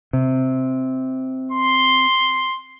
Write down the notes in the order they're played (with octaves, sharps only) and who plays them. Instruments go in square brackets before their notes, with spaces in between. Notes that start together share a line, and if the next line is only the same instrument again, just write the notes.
[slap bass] C3
[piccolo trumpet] C6